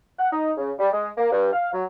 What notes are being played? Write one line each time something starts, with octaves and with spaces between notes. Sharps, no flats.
F#5
D#4
C#3
G3
G#3
A#3
G2
F5
F#3